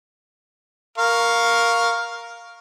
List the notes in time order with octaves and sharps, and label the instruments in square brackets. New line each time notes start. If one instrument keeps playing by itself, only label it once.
[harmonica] A#4 F5 C#6